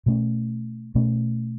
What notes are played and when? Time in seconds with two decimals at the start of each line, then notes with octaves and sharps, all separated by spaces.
0.06 B2 A3 C#4
0.95 B2 A3 C#4